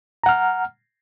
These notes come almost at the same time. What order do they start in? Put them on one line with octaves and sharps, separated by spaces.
A#5 F#5 F6